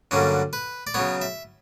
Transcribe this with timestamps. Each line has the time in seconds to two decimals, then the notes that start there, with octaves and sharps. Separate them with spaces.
0.11 G2 D3 F#3 A#3 C#4
0.53 B4
0.87 D5
0.94 C#3 F#3 B3 C#5
1.22 E5